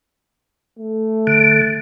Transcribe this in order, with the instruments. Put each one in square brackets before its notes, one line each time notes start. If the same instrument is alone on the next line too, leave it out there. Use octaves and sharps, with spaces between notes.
[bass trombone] A3
[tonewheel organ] D3